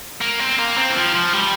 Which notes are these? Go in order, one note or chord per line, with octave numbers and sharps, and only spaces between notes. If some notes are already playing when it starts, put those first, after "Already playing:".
A#3
C4
A#3
C4
E3
F3
F3
G3